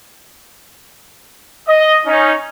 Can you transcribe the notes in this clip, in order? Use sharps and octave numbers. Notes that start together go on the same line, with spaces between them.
D#5
C#4 D#4